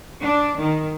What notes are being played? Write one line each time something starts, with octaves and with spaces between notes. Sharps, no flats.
D4
D#3